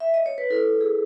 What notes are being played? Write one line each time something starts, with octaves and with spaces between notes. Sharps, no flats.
E5
D#5
C#5
B4
E4 A4
E4
G#4